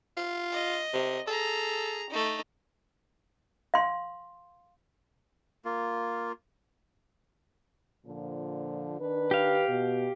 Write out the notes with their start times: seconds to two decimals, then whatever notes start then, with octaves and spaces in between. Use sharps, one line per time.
0.17 F4
0.52 D#5
0.93 C3
1.28 G#4 A4 A#5
2.09 A3 D#4
3.74 F5 C6
5.65 A#3 F4
8.06 A#2 D3 F3
9.00 D#3 D4 B4
9.31 G4 F5
9.68 B2